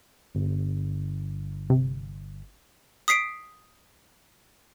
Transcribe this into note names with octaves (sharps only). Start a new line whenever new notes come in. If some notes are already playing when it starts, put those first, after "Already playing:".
G1
C3
D#6 B6 C7 D7